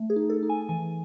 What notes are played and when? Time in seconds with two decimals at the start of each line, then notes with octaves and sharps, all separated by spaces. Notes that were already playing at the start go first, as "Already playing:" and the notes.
Already playing: A3
0.10 G#4
0.16 D#4
0.30 A4
0.43 D#4
0.50 G#5
0.69 E3 G#5